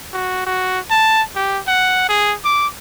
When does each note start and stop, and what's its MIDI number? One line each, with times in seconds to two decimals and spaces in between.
0.14 0.46 66
0.46 0.80 66
0.91 1.22 81
1.36 1.59 67
1.68 2.07 78
2.09 2.35 68
2.45 2.67 86